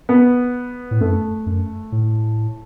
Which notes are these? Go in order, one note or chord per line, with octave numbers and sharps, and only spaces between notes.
B3
A2
F#2 A3
F#2
A2